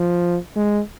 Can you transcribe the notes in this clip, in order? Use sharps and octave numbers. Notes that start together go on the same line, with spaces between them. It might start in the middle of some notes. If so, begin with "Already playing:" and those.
Already playing: F3
G#3